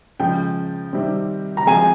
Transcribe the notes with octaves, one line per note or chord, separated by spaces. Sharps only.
C#3 F3 G#3 G5
C3 D#3 G3 C4
A#5
F3 G#3 C4 F4 G#4 G#5